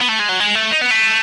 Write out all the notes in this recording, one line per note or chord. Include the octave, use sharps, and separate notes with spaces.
B3
A3
G#3
F#3
G#3
A3
D#4
B3
A3